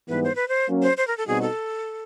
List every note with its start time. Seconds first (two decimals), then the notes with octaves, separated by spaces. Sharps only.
0.09 G#2 E3 G3 B3 B4
0.24 C5
0.35 B4
0.48 C5
0.68 F#3 A#3 C#4
0.82 C5
0.97 C5
1.07 A#4
1.17 A4
1.27 B2 G3 C4 D#4 F#4 G#4
1.42 A4